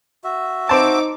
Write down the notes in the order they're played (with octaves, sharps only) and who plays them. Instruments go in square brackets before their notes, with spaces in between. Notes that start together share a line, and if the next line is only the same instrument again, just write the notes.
[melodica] F#4 E5
[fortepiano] C4 A5 [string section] D#4 D6